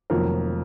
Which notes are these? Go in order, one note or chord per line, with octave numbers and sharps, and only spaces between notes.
F1 F2 D#3 F#3 A#3 A#4